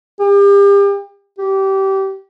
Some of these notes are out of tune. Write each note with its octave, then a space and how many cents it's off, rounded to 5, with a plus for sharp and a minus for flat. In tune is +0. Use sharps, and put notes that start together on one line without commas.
G4 +35
G4 -20